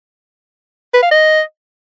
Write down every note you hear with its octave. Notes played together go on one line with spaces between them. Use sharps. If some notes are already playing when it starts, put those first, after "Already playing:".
B4
F5
D#5